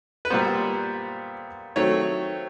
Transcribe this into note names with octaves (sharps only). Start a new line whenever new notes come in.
B4
A#2 G3 B3 C5
D#3 F#3 A3 C4 C#5